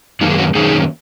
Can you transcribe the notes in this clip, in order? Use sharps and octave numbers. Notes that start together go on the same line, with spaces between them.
F#2 D#3 A#3 D#4
G#4
C#4 F#4
F#2 D#3 A#3 C#4 D#4 G#4